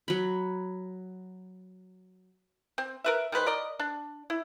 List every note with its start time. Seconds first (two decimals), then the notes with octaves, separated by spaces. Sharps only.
0.08 F#3 B5
2.78 C4
3.04 A#4 B4 E5
3.32 D#3 G#3 B4 C5
3.46 A#4 D5 D#5
3.79 D4
4.30 E4